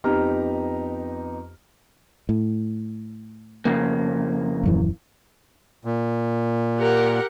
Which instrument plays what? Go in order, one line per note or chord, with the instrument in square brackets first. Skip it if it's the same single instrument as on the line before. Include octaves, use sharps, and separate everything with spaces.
[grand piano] F2 B3 D#4 G4 A#5 F6
[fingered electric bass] A2
[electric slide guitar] F2 C#3 A#3
[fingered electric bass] D#1 F#2 E3
[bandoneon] A#2
[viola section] G4 A#4 F#5